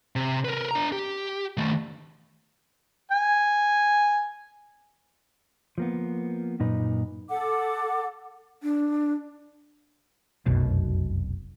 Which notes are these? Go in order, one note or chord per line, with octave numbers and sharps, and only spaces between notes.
C3
A#4 B4
D4 A#5
G4
D#3 A3
G#5
F3 A#3 B3
F#2 A#2 D#4 B4
A4 F#5 D6
D4
F1 B1 F#2 B2